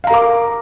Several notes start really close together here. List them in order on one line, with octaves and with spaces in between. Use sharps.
F5 A#5 A#4 D6